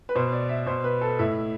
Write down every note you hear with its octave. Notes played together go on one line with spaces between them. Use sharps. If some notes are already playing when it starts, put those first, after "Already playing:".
B4
B2 C5
D5
E5
B2 C5
B4
A4
A2 E4